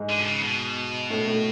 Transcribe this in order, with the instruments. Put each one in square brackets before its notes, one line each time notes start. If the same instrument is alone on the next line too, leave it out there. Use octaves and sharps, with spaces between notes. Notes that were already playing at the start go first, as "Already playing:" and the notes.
Already playing: [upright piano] G#2 G#3
[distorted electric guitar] D3
B2
C#3
B2
[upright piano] A2 A3
A2 A3